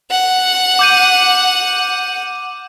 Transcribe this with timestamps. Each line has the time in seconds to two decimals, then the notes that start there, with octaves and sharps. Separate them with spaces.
0.11 F#5
0.79 D6 G6 D#7